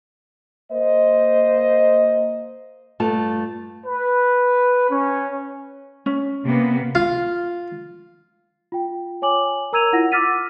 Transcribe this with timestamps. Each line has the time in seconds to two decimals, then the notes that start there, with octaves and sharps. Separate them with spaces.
0.72 A#3 C5 D#5
3.00 G2 A3 F4 A5
3.85 B4
4.90 C#4
6.06 C#4
6.45 C3 A#3 B3
6.95 F4
8.72 F4 G5
9.22 C#5 G#5 D6 F#7
9.73 A#4 A#5 E6 G#6 D#7 F7
9.92 E4 F4 F#5 A#6
10.12 D6 E6 F6 A6 B6 D#7